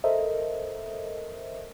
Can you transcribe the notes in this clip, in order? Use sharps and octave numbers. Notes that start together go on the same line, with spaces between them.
A4 A#4 C5 D#5 E5